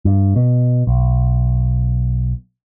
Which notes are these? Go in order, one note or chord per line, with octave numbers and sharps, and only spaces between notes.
G2
B2
B1